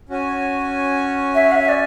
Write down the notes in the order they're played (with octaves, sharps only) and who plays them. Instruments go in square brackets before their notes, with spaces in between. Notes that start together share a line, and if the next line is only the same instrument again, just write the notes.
[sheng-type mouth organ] C#4 F#4 C#5 G#5
[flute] E5
F#5
E5
D5